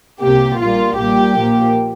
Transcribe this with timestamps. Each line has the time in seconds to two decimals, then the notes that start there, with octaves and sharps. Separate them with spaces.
0.20 C2 C3 A#3 G4
0.59 A#1 A#2 G3 A#3 F4
0.97 A#1 A#2 G3 A#3 G4
1.36 A#1 A#2 F3 A#3